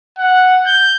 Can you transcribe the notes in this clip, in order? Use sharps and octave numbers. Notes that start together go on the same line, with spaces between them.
F#5
G6